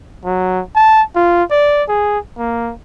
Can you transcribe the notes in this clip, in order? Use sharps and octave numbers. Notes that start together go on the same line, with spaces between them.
F#3
A5
F4
D5
G#4
A#3